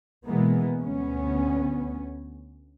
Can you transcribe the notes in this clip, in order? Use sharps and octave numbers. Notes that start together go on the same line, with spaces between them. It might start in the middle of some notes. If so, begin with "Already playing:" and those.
B2 E3 G#3 A#3 B3
D2 B3 C#4